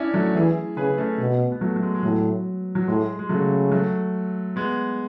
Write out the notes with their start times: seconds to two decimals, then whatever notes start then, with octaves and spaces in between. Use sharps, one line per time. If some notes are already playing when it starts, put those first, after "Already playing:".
Already playing: C#4 D4 E4
0.13 F#3 A3
0.35 E3 E4 G#4
0.77 C#3 G#4 B4
0.98 A3 C#4
1.19 B2
1.52 B3
1.61 F#3 A3
1.76 F#3
1.83 G#3
1.95 G#3
2.03 A2 F#3
2.75 F#3
2.88 A2 G#3
3.19 G#3
3.29 C#3 F#3 A3
3.72 F#3 A3
4.56 G#3 B3